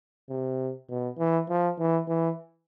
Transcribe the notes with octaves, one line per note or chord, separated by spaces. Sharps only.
C3
B2
E3
F3
E3
E3